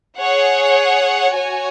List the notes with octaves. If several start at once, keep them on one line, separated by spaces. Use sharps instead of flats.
G#4 C#5 F#5
F#4 C#5 G#5